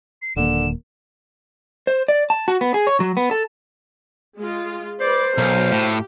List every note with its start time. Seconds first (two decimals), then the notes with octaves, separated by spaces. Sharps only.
0.22 C7
0.37 D#1 D3 A#3 E7
1.87 C5
2.08 D5
2.30 A5
2.48 F#4
2.61 B3
2.74 G#4
2.87 C#5
3.00 F#3
3.17 B3
3.31 A4
4.39 G#3 F4
5.00 B4 C5 D5 C6
5.38 B1 F#3 A#4 F5
5.72 A2 G4